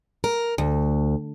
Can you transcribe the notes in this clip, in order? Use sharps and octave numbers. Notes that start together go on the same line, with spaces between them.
A#4
D2